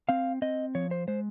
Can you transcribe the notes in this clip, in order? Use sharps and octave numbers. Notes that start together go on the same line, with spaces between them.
C4 F5
C4 D#5
F3 C#5
C5
G#3 C5